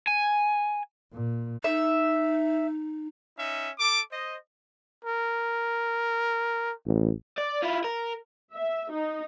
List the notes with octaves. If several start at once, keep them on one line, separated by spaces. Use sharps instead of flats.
G#5
A#2
D#4 E5
C#4 D#4 E5
A4 D6
C5 D#5
A#4
A1
D5
E4 F4
A#4
E5
D#4